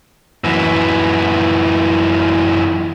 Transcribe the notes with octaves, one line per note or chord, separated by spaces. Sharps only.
F#2 E3